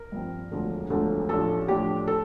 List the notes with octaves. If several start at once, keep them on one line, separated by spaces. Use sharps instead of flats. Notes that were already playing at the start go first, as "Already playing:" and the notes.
Already playing: A#4
G2 F3 C4
E1 D2 D3 F3 A3
E1 D2 D3 F3 A3
A1 A2 F3 A3 D4 A4
A1 A2 F3 A3 D4 G4
A4